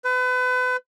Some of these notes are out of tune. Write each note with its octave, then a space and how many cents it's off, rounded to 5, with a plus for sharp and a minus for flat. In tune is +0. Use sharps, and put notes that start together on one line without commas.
B4 +35